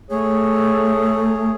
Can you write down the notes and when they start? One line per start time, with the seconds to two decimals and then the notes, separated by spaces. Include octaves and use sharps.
0.10 A3 G#4 C#5